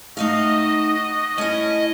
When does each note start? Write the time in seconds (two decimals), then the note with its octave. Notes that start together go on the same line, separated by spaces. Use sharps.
0.17 A3 D#4 F#4 D#5 F5
1.38 A3 C#4 E4 D#5